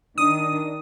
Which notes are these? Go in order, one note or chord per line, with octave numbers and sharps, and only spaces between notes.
D#3 D4 D#6